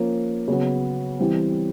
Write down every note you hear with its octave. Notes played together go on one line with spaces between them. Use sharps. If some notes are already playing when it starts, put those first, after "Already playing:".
Already playing: F3 A#3 C#4
C#3 F#3 B3
E3 G3 C4